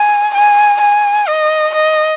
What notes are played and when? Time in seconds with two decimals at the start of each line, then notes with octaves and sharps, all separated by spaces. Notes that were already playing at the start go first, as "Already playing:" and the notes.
Already playing: G#5
0.34 G#5
0.81 G#5
1.27 D#5
1.74 D#5